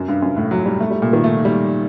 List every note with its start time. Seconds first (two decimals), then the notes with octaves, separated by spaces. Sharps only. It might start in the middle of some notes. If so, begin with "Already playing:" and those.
Already playing: F#2
0.08 G2
0.22 F#2
0.37 A2
0.51 F#3
0.66 G3
0.81 A3
0.91 G3
1.02 A#2
1.13 D#3
1.24 A3
1.45 G3